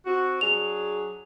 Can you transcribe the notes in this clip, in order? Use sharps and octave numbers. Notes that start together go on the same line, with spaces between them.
C4 F#4
F#3 D4 G#4 F7